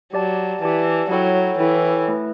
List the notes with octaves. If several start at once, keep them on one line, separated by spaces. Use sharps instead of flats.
F#3 G4 D5 A5
E3 G4 D5 A5
F#3 E4 A4 C#5 G5
E3 E4 A4 C#5 G5
A3 E4 B4